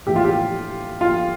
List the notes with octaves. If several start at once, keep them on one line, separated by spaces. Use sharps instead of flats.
A2 E3 G4
F4
G4
F4